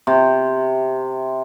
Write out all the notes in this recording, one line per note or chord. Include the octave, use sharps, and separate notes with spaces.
C3